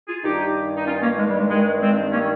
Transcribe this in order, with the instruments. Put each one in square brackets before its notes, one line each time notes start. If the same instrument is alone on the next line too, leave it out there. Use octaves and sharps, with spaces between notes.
[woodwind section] F4 G#4
G2 D#3 D#4 G4
D#4
C#4 F4
A#3 C#4
G#3
G3
G#3
G2 D#3 G#3
G#3 C4
A#3 C#4